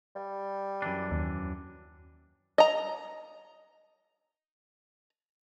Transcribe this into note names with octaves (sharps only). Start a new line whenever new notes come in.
G3
F#2 E3 D4
D#2
D#5 A#5